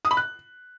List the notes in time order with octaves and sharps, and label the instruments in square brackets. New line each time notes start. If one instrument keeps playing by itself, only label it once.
[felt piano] D#6
B5
F#6